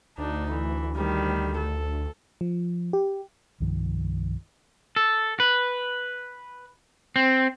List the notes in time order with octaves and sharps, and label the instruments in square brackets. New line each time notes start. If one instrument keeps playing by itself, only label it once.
[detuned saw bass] D2 [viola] D4 D#4
[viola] E3
D#3 G3
A4
[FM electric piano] F3
G4
[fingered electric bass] C2 G2 D#3 F3
[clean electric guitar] A4
B4
C4